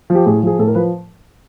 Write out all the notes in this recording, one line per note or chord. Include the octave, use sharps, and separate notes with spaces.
F3
G4
A2 G#4
F3 G#4
A2 A4
A#4
F3 B4